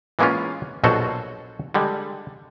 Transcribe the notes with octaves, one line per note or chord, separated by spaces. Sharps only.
E3 G#3 A#3 B3 C#4 F4
A#1 B2 F#3 F#4 A4 C5
D3 G3 G#3